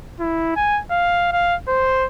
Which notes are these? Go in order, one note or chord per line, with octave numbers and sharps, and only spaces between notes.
E4
G#5
F5
F5
C5